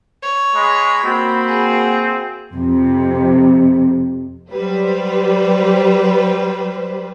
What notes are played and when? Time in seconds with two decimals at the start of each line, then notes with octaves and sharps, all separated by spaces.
0.22 C#5
0.55 G#3 B5
1.04 A#3 C4 F#4
1.47 G#4
2.52 F2 C3
4.51 F#3 G3 B4 C5